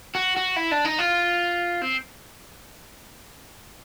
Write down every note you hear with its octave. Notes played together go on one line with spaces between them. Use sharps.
F#4
F#4
E4
D4
D#4
F4
C4